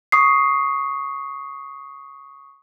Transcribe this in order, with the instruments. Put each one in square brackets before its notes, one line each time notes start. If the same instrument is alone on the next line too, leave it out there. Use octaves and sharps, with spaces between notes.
[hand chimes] C#6 D#6 C7